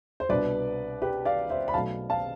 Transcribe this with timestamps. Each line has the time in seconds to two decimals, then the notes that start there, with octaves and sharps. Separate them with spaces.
0.20 C5
0.29 C2 B2 B3 D4 B4 D5
1.02 G4 B4
1.25 D5 F5
1.50 C5 E5
1.68 B5
1.74 B1 B2 A3 F5 A5
2.10 F5 A5